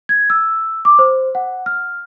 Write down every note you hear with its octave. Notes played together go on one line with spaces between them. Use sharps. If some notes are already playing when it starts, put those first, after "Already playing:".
G#6
E6
D6
C5
F#5
F6